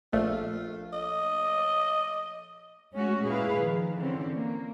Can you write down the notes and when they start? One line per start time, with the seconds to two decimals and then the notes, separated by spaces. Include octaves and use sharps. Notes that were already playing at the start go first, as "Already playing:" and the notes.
0.13 A#1 A3 F4
0.93 D#5
2.94 G#3 A3 C#4 F#4
3.27 A#2 E4 G#4 B4 F5
3.58 D#3 F3
3.98 D3 E3 C4 C#4
4.34 A#3